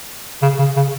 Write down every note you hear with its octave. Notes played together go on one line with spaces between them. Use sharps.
C#3
C#3
C#3